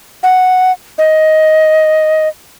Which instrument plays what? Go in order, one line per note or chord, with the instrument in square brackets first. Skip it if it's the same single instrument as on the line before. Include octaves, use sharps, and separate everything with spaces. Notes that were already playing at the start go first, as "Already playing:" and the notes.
[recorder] F#5
D#5